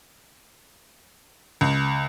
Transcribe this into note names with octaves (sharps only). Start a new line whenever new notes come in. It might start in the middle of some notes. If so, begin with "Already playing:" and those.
C#2